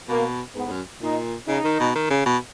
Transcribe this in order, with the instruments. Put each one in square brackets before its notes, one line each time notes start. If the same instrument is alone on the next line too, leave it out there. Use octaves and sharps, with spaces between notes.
[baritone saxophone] B2 [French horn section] A#3
[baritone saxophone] G#2 [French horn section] B3
[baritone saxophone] G#2
F#2
[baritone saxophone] A#2 [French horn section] D#4
[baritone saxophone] C#3 [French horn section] D#4
[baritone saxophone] D#3
B2
D#3
C#3
B2